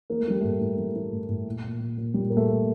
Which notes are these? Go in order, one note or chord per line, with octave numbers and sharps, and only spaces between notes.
E3 A#3
A3
E3 G3
A2 A3
A2
E3
E3
A2
A2
A#2
A#2
A#2
A#2
A#2 G3
A#2 A#3
A3
A#2